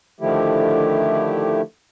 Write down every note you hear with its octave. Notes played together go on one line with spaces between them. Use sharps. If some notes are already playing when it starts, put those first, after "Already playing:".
D3 D#3 F3 A3 E4 G4